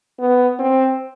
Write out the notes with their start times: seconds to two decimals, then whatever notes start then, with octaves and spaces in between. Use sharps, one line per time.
0.20 B3
0.59 C4